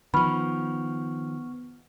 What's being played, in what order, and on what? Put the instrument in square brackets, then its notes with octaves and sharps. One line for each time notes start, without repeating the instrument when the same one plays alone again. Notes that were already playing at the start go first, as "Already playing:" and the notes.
[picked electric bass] D#3 F3 [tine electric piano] B3 C#6 F6 [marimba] B5